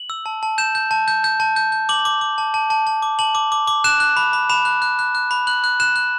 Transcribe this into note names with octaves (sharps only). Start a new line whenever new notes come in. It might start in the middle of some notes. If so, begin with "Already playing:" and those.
Already playing: F#7
E6
A5
A5
G6 E7
G6
A5
G6
G6
A5
G6
G6
D6 F#7
D6
D6
A5
A5
A5
A5
D6
A5 F#7
D6
D6
D6
F#6 E7
F#6
B5
B5
B5 E7
F#6
F#6
F#6
F#6
B5
F#6 F#7
F#6
F#6 E7
F#6